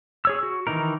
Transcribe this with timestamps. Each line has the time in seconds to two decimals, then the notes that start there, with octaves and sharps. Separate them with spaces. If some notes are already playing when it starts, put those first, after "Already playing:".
0.25 G#4 C#5 E6
0.43 F#4
0.67 D#3 E3 D#4 A#4